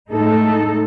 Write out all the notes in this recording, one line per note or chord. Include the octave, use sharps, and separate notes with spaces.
A2 G#3 D#4 A4